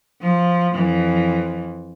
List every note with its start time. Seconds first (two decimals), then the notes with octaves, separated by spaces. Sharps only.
0.21 F3
0.73 F2 E3